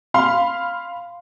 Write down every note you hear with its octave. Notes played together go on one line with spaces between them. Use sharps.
F5 B5 C6